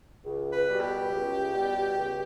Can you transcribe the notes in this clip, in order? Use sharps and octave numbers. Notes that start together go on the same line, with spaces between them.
C#2
B4
B2 G3
G4
C#2
B2 G3
C#2